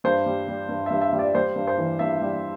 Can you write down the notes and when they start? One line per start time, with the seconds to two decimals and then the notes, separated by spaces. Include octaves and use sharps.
0.04 G2 C5
0.26 G3
0.48 G3
0.69 G2
0.86 G2 E5
1.01 E5
1.13 G3
1.19 D5
1.35 G3 C5
1.56 G2
1.67 C5
1.78 E3
1.99 G2 E5
2.21 G3